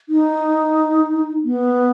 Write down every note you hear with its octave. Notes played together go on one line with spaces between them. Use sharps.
D#4
B3